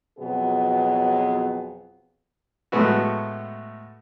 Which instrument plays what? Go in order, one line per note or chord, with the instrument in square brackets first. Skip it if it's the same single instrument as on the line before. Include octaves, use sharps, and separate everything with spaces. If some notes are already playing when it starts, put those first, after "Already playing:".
[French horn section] F2 B2 F#3 B3 G#4
[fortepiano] A2 G#3 A3 B3 F#4